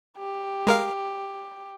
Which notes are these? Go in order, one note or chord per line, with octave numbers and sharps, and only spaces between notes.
G4
G#3 A#4 F5